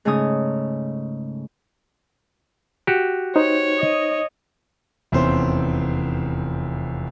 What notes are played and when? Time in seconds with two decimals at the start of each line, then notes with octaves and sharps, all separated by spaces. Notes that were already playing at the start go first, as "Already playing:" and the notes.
0.05 G#2 C#3 A3 C#4 G#5 D#6
2.87 F#4 G4
3.36 D#4 C5 C#5
3.77 D#5
5.12 F1 E2 C4 C#4 C5 C6